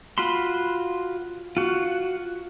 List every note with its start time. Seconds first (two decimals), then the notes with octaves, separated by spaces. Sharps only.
0.18 F4 F#4 B5 C6
1.57 F4 F#4